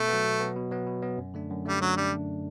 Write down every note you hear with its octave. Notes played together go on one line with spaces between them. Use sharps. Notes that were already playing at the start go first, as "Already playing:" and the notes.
Already playing: B2 A3
F#3 B3
B2
F#3 B3
B2
F#3 B3
B2
F#3 B3
F#2
D3 A3 D4
F#2
D3 G3 A3 D4
F#2 F#3
D3 G3 A3 D4